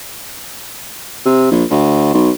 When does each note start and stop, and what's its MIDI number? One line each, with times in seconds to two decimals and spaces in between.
1.25 1.47 48
1.51 1.64 34
1.71 2.11 38
2.14 2.30 35